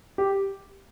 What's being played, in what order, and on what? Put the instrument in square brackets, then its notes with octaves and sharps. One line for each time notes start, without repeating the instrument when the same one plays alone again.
[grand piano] G4